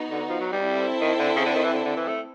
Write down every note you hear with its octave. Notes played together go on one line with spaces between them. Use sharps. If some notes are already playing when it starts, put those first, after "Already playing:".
Already playing: B3 D#4 F#4
D3
F3
F#3
G3
C4 E4 A4 C5
D#3
D3
C#3
D3
D#3
E3
D3
D3
E3
A3